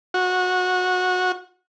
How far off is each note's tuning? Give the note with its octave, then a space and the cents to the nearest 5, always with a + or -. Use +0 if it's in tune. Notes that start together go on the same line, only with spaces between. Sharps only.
F#4 -20